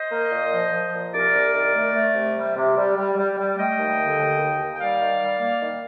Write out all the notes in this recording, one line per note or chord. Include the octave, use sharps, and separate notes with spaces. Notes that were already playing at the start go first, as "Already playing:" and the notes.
Already playing: C5 D#5
A#3
A#2
F3
F3
A#2
C2 A#4 D5
C2
D#3
A3
A3
C3
G3
C3
G3
G3
G3
G3
A3 D#5 G5
D#2
D3
D#2
D#2
D#2
G5
G3 D5 F5
D#3
G3
A#3
D#3